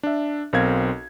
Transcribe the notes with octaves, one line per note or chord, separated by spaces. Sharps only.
D4 E5
B1 C4 A#4 F5 G#6